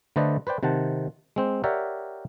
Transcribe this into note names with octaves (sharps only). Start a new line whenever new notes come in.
D3 A3 B4 C5 D5 D#5
B4 C5 D5 G5
C3 D#3 C5 F#5 A5
G#3 C4 C5
G4 A#4 C#5 D5 E5 F#5